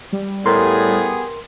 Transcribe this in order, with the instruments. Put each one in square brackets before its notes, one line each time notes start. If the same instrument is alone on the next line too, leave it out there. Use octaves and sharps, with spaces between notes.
[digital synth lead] G3
[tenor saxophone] A2 [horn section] B3 G4 G#4 [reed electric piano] A#4 C6